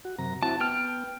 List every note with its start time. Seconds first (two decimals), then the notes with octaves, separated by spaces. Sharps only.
0.05 F#4
0.19 F#2 C3 A#5
0.43 C4 E4 F#4 A5
0.60 B3 G5 F6